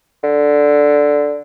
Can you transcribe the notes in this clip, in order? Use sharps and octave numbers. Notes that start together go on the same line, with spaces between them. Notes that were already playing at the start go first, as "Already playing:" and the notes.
D3